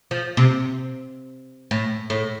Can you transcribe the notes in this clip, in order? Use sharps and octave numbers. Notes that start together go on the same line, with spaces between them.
F3
C3
A2
A2